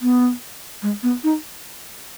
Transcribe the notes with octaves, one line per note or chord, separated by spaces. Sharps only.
B3
G#3
B3
D#4